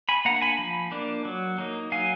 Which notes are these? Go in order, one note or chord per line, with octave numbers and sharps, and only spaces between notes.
G#5 B5
A#3 D4 F#5 A#5
G#5 B5
F3
A#3 D4
F#3
A#3 D#4
F#3 F5 G#5